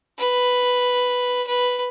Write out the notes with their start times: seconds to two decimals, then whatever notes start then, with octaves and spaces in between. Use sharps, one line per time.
0.19 B4
1.47 B4